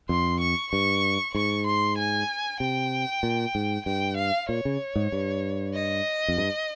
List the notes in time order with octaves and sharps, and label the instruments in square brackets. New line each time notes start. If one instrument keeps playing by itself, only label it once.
[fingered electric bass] F2 [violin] C6
[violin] C#6
[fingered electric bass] G2 [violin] C#6
[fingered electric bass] G#2 [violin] C#6
[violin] C6
G#5
[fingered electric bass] C3 [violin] G5
[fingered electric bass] A#2
G#2
[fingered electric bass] G2 [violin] G5
[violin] F5
[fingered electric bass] A#2 [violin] C#5
[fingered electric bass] C#3
G#2
G2
[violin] D#5
[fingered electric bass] F2
G2